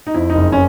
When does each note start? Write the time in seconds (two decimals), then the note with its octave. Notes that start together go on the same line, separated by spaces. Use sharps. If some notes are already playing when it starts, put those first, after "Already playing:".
0.07 D#4
0.14 F2 E4
0.30 D#4
0.35 F#1
0.52 C#4